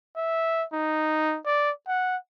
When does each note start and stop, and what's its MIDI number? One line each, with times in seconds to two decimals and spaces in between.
0.16 0.64 76
0.72 1.38 63
1.46 1.71 74
1.88 2.16 78